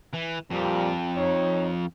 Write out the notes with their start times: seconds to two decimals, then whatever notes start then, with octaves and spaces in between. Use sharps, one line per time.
0.13 E3
0.51 F2 A#2 F3 G3
1.16 D#4 C#5